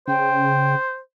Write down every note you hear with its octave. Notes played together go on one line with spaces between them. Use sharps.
C#3 C5 G5